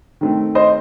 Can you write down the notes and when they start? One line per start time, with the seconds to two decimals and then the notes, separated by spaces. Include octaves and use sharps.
0.21 D#3 A3 C4
0.55 C5 D#5